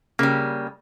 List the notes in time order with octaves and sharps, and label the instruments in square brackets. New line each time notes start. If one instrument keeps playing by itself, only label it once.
[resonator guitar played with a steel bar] C#3 G3 [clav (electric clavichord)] A#3